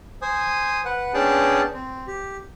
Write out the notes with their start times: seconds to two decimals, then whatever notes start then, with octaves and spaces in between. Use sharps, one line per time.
0.22 C5 G#5 D#6
0.85 B4 F#5
1.14 B3 C#4 D4 G#4 G5 A5
1.73 C4
2.07 G4